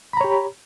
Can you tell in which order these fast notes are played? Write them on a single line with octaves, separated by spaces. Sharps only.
B5 A#5 C#5 G4